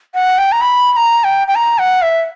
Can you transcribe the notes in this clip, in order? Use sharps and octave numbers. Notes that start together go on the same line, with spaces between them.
F#5
G5
A#5
B5
B5
A#5
G5
G5
A#5
F#5
E5